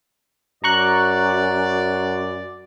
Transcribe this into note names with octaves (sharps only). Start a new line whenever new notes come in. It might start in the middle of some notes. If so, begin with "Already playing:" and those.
F#2 D5 A#5 C#6 F#6